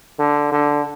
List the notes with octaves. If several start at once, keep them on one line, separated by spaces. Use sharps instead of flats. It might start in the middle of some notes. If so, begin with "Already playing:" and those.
D3
D3